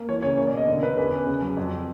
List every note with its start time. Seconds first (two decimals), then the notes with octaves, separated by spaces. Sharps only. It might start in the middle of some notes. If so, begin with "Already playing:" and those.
Already playing: A#3
0.09 E3 C#5
0.23 C#3 C#5
0.38 A#3 C#5
0.47 D5
0.53 B2 D#5
0.68 D3
0.82 D3 B4
0.97 E2 B4
1.12 C#4
1.27 C#3
1.42 F#3
1.57 F2